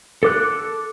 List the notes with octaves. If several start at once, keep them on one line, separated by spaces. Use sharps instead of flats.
A4 D6 F#6